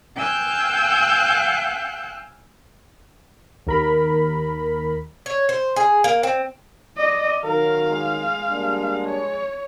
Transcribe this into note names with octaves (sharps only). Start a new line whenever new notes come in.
F5 G5 G#5 E6 F#6 G6
D#2 A#4 B5
C#5
C5
G#4
A#3
C4
D5 D#5
D#3 F#3 A#4 F5
G#3
G3 A#3 D4
C#5